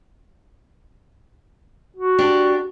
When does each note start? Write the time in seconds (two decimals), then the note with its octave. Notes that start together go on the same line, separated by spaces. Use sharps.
1.97 F#4
2.18 D4 G4